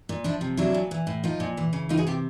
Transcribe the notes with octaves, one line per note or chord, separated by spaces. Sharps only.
A#2
F3 D4 E4
C3
F#3 D4 E4
A#2
E3
A2
F3 D#4 F4
A#2
E3
C#3
E3 D#4 F4
F#4 G#4
C3 F4 G4